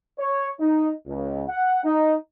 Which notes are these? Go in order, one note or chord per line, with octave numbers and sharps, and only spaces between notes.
C#5
D#4
C#2
F#5
D#4